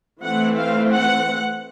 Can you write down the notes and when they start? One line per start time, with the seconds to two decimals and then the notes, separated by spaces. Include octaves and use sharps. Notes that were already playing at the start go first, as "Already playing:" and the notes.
0.22 E3 A3 C4 F#5
0.56 F5
0.91 F#5